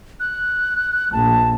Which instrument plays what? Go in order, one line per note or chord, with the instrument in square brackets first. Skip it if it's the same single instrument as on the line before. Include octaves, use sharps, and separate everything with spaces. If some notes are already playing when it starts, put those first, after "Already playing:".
[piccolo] F#6
[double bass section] A#1 [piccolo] A5